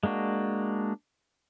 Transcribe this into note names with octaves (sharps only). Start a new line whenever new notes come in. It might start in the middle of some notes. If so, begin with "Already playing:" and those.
G#3 A#3 D4 F#4